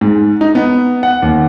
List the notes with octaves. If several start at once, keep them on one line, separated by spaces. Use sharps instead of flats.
G#2
D#4
B3
F#5
D#2